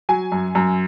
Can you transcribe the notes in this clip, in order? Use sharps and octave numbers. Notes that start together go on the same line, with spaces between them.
F#3 G#5
F#2
F#2